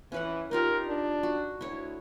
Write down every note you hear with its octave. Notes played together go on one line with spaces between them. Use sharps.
E3 C#4 B4 F#5
D#4 F4 G4 A#4
D4
F#4
D2 E4 C#5